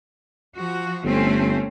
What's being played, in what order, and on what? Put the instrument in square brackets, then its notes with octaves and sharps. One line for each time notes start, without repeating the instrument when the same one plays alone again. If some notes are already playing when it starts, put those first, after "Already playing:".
[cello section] F3 F#4
[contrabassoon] G1 [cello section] A3 C4 C#4